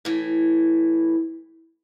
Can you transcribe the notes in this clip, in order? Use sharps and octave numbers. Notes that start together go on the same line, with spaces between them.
A2 E3